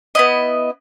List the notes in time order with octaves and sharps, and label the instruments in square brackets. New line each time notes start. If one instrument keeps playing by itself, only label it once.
[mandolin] B3 E4 D#5